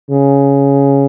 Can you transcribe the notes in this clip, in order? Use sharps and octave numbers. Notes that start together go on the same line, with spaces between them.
C#3